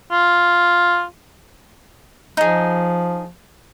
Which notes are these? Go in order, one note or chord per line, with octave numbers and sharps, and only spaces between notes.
F4
F3 D#4 G#4